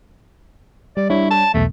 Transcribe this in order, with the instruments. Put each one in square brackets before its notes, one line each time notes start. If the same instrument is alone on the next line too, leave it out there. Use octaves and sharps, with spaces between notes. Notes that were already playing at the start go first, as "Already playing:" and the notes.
[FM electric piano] G3 [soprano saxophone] D5
[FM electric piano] G3 D4 C#5 [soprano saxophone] E4
[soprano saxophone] A5
[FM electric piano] B1 E2 [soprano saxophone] A3